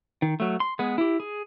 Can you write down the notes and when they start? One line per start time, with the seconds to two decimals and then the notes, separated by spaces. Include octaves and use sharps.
0.22 D#3
0.40 F#3 A3
0.60 C6
0.79 G#3 B3 G#4
0.98 E4 G4
1.20 G#4